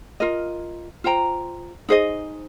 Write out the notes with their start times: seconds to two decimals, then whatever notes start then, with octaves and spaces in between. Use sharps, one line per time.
0.20 F4 A#4 D#5
1.04 F4 C5 G5 A#5
1.89 D#4 G#4 C5 D#5